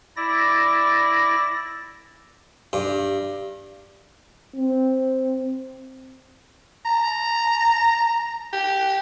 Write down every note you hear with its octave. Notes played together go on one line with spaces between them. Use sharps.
E4 D5 A#6
G2
C4
A#5
G4